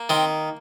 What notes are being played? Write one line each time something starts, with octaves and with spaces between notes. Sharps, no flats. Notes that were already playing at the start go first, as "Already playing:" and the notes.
Already playing: A#3
D#3 C4